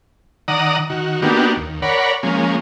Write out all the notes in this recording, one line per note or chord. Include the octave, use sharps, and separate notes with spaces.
D#3 D5 F#5 A#5 D#6
D#3 F#4
A#3 B3 D4 D#4 F#4 G4
D#2
A#4 C#5 D5 F#5 B5
F3 G#3 A#3 C#4